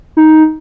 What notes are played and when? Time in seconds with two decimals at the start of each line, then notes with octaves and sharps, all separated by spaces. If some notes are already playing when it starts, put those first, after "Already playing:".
0.17 D#4